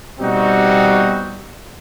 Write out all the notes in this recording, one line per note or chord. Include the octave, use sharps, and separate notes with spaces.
B2 G3 C4 D#4 F#4